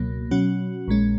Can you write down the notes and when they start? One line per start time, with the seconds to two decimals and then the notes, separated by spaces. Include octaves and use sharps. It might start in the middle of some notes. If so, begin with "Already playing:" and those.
Already playing: C#2 B2 F#3 A#3
0.31 B2 F#3 C#4 F#4
0.88 A#1 A#2 G#3 C#4